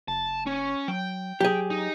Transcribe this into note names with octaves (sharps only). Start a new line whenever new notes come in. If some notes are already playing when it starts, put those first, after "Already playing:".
F#1 A5
C#4
F#3 G5
F#3 G4 G#4
D#4